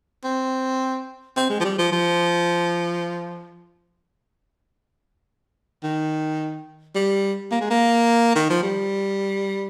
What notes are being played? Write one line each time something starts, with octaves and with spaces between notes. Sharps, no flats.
C4
C4
G#3
F3
G3
F3
F3
D#3
G3
A#3
G#3
A#3
D#3
F3
G3